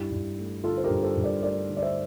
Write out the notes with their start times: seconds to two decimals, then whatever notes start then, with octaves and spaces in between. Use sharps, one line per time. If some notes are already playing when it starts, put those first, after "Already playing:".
Already playing: G2 E4 G4
0.11 G2
0.38 A3
0.64 D3 F4 A4
0.78 C5
0.84 G4 A#4
0.90 G2
1.03 A4 C5
1.17 G2
1.23 A#4 D5
1.42 A3 A#4 D5
1.70 D3
1.77 D5
1.82 C5 E5